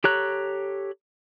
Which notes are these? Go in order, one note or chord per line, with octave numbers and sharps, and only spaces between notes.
G4 A4 C#5 A#5 F#6